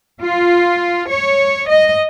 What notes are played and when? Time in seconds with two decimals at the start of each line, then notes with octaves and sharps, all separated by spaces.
0.21 F4
1.10 C#5
1.69 D#5